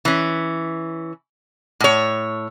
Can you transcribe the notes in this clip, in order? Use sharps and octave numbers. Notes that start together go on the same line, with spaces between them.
E3 C#4
A2 C#5